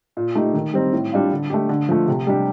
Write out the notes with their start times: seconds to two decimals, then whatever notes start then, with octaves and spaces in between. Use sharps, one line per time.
0.17 A#2
0.35 A3 D#4 G4
0.54 D#3
0.74 G3 C4 D#4
0.93 A2
1.13 G3 D4 F4
1.32 D3
1.50 A3 D4 G4
1.69 D3
1.89 F3 A3
2.08 C3
2.27 G3 D4 G4